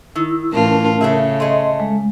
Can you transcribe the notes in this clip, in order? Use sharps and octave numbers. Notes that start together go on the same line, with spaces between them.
D#3 E4 E6
A2 E3 C#4 F4 A#4 A5
C#3 A3 G#4 E5
A3 G#4 D#5 C6
G#3